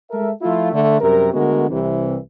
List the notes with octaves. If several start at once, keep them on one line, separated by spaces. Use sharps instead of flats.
G#3 A4 A#4 E5
F3 A3 E4 F4
D3 A3
F#2 C3 G3 A#4
D3 G#3 A3 B3 F#4 A#4
C2 C3 E3